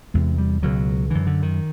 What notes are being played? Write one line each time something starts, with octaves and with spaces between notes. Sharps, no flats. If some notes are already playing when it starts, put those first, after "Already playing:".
E2 C3 G#3
G3
C#2 B2 F#3
F#2 D3 E3
D3
D#3